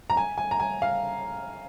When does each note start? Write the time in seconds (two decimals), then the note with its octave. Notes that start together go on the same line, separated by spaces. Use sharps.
0.10 A#5
0.17 G#5
0.38 G#5
0.51 A#5
0.60 G#5
0.82 F5